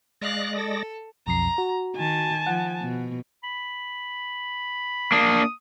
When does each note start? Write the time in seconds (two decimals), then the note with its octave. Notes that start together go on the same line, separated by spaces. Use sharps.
0.21 G#3 D5 F5 F#6 A#6
0.55 A4
1.27 B1 F2 A#5 C7
1.58 F#4
1.96 D#3 G#5 A5
2.47 F3 F#5
2.82 B2
3.43 B5
5.12 A#3 D4 D#6